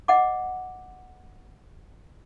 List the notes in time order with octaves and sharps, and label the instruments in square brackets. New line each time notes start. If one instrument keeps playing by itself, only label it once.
[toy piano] D#5 F#5 D6